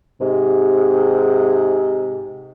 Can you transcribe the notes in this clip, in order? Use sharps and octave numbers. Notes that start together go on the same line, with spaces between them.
G#2 C3